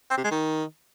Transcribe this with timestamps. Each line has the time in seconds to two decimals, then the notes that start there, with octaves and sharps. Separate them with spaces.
0.11 C4
0.17 C3
0.24 G#3
0.31 D#3